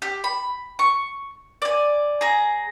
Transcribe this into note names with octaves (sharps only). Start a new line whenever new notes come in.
G4
B5
C#6
D5 G#5
G#4 A#5